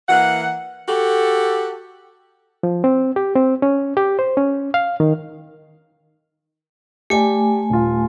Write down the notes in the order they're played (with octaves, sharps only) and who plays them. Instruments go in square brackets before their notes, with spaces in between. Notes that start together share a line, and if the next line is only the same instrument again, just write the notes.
[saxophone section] E3 A#3 F#5
F#4 G4 A4
[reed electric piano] F3
C4
G4
C4
C#4
G4
C5
C#4
F5
D#3
[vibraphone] A3 G#5 [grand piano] G4 D5
[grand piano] D#1 F4